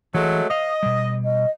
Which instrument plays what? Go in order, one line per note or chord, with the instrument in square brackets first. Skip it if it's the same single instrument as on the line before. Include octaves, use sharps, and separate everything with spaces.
[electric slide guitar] E3 [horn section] F#3 G#3 A3
[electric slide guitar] C5 F5 [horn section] D#5
[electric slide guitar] B2 G3
[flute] D#5